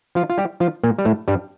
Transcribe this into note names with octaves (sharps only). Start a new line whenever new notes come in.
F3 F4
F4
G3 G4
F3 F4
A#2 A#3
G3
A2 A3
G2 G3